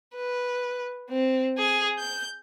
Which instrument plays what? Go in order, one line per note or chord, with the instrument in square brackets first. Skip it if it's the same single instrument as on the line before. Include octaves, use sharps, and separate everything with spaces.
[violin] B4
C4
G#4
G6